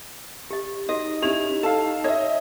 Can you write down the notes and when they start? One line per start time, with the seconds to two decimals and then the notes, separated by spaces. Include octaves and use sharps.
0.51 G4 D#5
0.89 D#4 F#4 D#5
1.22 C#4 E4 G4 F7
1.63 A4 F5 A5
2.04 C#5 D#5 E5